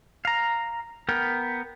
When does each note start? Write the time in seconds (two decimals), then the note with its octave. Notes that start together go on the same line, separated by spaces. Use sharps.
0.25 F5 A#5
1.09 B3 A#4 G5